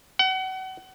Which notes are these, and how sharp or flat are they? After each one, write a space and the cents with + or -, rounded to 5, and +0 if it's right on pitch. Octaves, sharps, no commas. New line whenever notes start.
F#5 +35